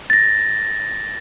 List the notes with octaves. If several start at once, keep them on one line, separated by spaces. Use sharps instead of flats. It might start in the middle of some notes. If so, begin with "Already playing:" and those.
A6 A#6